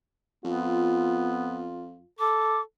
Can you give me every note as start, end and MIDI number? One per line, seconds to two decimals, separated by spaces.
0.45 1.99 41
0.45 1.72 59
0.45 2.09 65
2.19 2.61 69
2.19 2.61 86